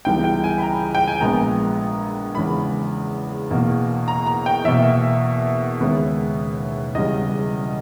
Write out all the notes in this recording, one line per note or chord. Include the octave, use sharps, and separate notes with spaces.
C#2 C#3 E3 G3 B3 G5
G5
G#5
B5
A#5
G5
G#5
A#1 A#2 G#3 B3 A#5
E2 C#3 G#3 B5
E2 B2 A#3
A#5
A#5
G5
E2 B2 A#3 E5
D#2 C#3 G#3 B3
E1 E2 C#3 G3 D#5